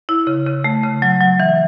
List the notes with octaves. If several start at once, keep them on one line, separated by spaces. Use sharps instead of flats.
E4
C#3
C#3
A3
C#3
F#3
F#3
E3